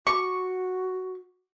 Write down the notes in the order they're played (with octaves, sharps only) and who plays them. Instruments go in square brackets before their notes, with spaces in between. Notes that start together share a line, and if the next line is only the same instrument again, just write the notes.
[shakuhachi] F#4 [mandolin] C#6